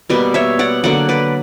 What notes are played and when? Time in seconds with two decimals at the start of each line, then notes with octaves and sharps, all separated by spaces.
0.10 B2 G3 A#3 B4 D5
0.34 C#5 E5
0.59 D5 F#5
0.84 D3 F#3 A#3 D5 F#5
1.09 B4 D5